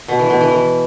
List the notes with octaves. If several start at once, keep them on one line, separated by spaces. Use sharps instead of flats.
B2
E3
B2
E3
E3